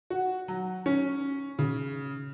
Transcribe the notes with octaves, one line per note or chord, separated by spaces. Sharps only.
F#4
F#3
C#4
C#3